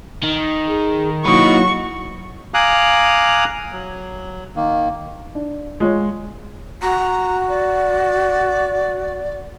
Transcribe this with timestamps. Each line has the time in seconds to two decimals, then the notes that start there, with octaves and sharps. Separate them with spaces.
0.23 D#3
0.68 G#4
1.25 F#3 A#3 D#4 E4 F#4 B4 D#5 C#6
2.54 F5 G#5 A#5 D6 D#6 F#6
3.72 F#3
4.56 D#3 A#3
5.35 D4
5.80 G#3 F4 C#5
6.82 F#4 A#5
7.49 D5